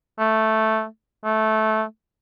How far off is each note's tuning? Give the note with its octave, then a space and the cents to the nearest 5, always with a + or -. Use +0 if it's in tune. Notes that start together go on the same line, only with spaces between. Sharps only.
A3 +0
A3 -15